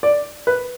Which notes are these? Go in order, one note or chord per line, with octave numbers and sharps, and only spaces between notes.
D5
B4